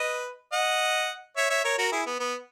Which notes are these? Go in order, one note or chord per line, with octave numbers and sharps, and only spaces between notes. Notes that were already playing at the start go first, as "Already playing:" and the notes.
Already playing: B4 D#5
D#5 F#5
C#5 E5
C#5 E5
A#4 C#5
F#4 A#4
E4 G#4
B3
B3